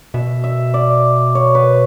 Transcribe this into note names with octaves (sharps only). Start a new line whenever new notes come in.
B2 E5
E5
D5
C#5
B4